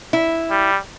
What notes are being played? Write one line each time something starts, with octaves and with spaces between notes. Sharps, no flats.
E4
G3